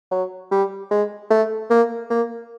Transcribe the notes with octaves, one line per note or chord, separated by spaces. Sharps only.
F#3
G3
G#3
A3
A#3
A#3